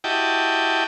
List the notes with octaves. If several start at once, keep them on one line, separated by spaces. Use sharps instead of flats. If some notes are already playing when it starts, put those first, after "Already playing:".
E4 F#4 G4 D#5 G5 A5